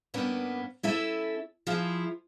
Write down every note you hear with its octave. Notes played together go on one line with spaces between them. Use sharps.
G2 A#3 B3 C#4 D4
C#4 E4 A4 E5
F3 E4 F4 G#4